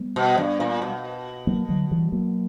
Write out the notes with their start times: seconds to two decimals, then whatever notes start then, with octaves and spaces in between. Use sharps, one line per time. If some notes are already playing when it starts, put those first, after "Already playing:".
Already playing: G3 B3
0.16 B2
0.38 G2
0.60 A#2
0.82 B2
1.47 F#3 A#3
1.69 D3 F#3
1.91 E3 G3
2.12 F#3 A#3